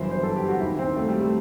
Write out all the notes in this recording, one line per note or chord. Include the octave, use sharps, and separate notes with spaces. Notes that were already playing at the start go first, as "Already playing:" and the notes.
Already playing: G1 F#2 E3 C5
C5
A4
G4
F#4
D#2 D#3 E4
C4
A3
G3
A3